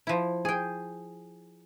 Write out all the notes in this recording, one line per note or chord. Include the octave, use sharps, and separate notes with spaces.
F3 E4
G#4 G5